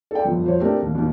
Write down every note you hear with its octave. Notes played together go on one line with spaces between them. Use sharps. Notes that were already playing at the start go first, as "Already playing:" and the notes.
A4 D5 G5
G1 F2
F2 C5 C#5
A3 C4 D4 G4 A#4
D#2
D#2 D#3